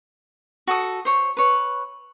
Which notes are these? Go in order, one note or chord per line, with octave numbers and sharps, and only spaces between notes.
F#4 A4 D#6
C5 C#5
B4 C#5